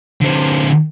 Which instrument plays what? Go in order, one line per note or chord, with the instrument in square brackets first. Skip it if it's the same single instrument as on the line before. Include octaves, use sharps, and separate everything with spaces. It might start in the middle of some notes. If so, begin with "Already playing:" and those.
[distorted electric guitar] D3 C4